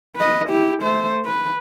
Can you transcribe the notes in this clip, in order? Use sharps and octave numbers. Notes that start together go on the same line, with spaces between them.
B4 D#5
E4 G4
A3 C5
B4